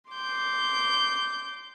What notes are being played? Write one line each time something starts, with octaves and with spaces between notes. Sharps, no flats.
C6 D6 G6